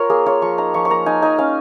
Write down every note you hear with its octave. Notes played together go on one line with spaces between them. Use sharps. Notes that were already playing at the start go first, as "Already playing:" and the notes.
Already playing: F4 A#4 C#5
A#3 G#4
F4 C#5
F3 C#6
D#4 A#5
F3 C#6
C#6
A#3 A#5
D#4 G#5
D#4 G#5
C#4 F5